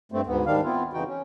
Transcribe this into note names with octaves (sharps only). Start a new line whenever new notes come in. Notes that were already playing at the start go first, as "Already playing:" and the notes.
G2 A3 C4
D2 G#2 B3
G#2 D#3 G3 D4 F5
B3 C4 E4 F4
F2 C#3 E3 D#4 F#4 G5
C#4